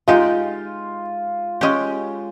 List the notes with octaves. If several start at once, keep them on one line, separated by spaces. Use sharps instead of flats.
G#3 D#4 F4 G4
G#3 C#4 G4